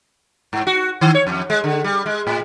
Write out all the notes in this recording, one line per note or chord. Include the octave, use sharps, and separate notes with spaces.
G#2
F#4
D#3
C#5
F2
G#3
D3
G3
G#3
A2